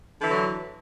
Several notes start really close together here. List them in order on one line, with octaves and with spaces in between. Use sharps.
D3 E3 F#3